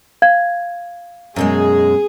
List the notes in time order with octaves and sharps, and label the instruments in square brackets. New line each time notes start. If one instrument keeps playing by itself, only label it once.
[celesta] F5 G#6
[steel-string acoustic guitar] F#2 B2 G#3 [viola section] G#4